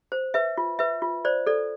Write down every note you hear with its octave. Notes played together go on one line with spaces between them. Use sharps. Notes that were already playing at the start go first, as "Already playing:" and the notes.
C5
B4 E5
F4
B4 E5
F4
C5 D5
A4 D5